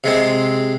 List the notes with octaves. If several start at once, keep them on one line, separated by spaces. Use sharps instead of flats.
C3 G#3 C4